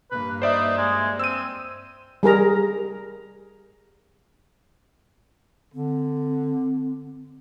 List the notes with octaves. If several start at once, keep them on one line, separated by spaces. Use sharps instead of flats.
G2 A#3 B4
D#4 C5 D5 E5
G#3
C4 E6 D#7
G3 G#4 A#4 A#5
D3 C4